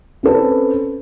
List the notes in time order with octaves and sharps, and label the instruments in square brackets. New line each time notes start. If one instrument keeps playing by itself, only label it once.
[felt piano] C4 C#4 A4 B4